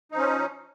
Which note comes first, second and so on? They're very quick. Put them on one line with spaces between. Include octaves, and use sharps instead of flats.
D#4 F3 C#4